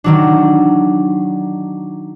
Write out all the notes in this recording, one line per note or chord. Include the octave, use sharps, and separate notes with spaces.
D#3 F#3 D4